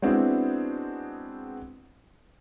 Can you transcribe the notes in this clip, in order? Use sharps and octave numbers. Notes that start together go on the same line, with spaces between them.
G#3 B3 C4 D4 E4 F#4